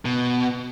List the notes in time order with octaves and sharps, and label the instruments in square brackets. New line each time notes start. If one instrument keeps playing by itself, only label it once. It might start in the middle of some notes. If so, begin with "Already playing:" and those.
[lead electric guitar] B2